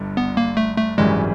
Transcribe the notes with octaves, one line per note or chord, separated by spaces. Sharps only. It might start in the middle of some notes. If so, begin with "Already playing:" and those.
Already playing: G1 G2 D3
B3
A#3
A3
A3
G#1 F#2 C#3 E3 G3 G#3